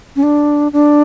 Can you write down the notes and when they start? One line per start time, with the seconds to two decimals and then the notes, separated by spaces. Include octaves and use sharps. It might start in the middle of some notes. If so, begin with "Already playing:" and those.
0.16 C#4
0.23 D4
0.73 D4